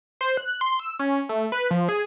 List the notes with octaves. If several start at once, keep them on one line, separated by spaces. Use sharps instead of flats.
C5
F#6
C6
E6
C#4
A3
B4
F3
G#4